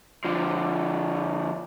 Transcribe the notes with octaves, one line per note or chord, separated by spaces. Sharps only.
D3 F3